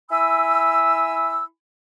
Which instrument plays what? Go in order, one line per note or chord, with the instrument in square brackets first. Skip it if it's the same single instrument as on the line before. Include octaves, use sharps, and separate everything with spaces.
[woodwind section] E4 G#5 B5 E6